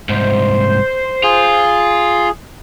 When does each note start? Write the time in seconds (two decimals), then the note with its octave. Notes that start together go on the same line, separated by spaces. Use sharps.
0.09 C2 G#2 C5
1.24 F4 G#4